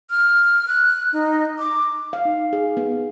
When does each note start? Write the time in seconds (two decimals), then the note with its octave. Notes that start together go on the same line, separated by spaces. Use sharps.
0.10 F6
0.67 F#6
1.13 D#4
1.59 D6
2.13 F5
2.25 D#4
2.53 G#4
2.77 B3